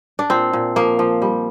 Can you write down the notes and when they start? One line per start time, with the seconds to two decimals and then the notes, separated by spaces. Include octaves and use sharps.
0.19 D4
0.30 A#2 C4
0.53 A#2
0.76 F3 A#3
0.99 F3
1.22 G3